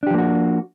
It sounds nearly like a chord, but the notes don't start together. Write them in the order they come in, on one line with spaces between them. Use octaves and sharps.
D4 G4 F3 A#3 F#4